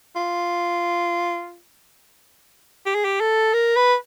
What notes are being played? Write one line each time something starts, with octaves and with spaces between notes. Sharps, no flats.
F4
G4
G#4
G4
A4
A#4
B4